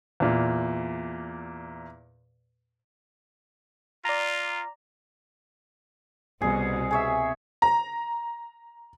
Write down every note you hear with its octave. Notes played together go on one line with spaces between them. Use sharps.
E2 A#2
F4 D5 A#5
C2 B2 G#4
G#4 C#5 E5
A#5